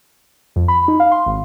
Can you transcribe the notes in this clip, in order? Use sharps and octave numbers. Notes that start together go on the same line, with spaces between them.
F2
B5
D#4
F5
C6
G#1